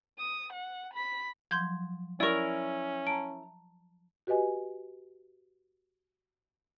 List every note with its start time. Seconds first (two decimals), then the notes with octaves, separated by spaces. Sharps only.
0.19 D#6
0.53 F#5
0.93 B5 B6
1.51 F3 F#3 C6 G6 G#6
2.20 C#4 E4 A#4 D5 C#6
3.07 A5 A#5 D7
4.27 F#4 G4 B4 D#5 G#5